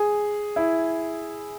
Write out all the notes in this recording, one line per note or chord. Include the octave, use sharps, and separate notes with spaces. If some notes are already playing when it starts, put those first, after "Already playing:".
Already playing: G#4
E4